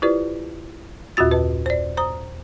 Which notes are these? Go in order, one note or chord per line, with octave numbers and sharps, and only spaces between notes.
E4 F4 G4 B4 C5 D5
D#2 A#2 F4 F#4 A6
F#2 B4 D#5 A5
C5 D5
C5 A#5 D#6